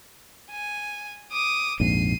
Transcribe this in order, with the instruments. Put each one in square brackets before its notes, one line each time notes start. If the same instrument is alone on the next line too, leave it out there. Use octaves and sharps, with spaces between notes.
[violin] G#5
D6 D#6
[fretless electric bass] A#1 F2 G#2 [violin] C7 D#7